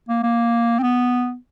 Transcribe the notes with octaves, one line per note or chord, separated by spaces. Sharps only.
A#3
A#3
C4
B3